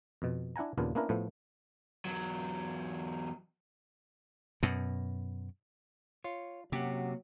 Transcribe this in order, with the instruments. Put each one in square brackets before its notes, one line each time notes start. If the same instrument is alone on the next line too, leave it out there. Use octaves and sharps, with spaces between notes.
[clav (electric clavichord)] F2 B2
D4 E4 F#5 G#5 A#5
D#2 A#2 C#3 B3 D4 F4
A#3 B3 C#4 D4 E4 A#4
A2 F3 A3 B3
[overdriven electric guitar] E2 F#3
[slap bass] F#2 B2
[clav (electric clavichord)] F4 [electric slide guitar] C#5
[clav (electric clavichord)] F#2 G4 [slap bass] C3 [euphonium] F#3 [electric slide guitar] A#3 F#5